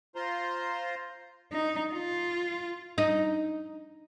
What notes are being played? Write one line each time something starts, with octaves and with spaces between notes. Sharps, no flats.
F4 C5 A#5 C6
D#4
F4
D#4